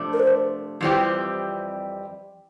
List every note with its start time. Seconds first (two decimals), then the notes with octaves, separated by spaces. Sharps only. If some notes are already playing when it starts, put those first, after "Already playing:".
Already playing: C3 F3 A3 D4
0.13 A#4
0.20 C5
0.81 F2 E3 G3 C4 G4